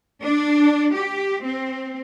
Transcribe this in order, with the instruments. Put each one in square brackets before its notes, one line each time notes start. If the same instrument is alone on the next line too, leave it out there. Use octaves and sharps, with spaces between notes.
[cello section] D4
G4
C4